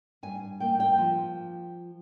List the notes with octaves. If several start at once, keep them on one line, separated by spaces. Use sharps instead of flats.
G2 G#5
A#3 G5
G5
F3